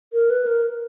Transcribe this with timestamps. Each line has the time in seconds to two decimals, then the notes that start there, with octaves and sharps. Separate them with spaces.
0.13 A#4
0.30 B4
0.46 A#4